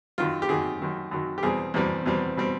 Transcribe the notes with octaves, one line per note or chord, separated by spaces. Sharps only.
F#2 D#3 F#3 F4
G4
F#2 D#3 F#3 G#4
F#2 D#3 F#3
F#2 D#3 F#3
G4
E2 B2 G3 C4 G#4
E2 B2 G3 C4
E2 B2 G3 C4
B2 G3 C4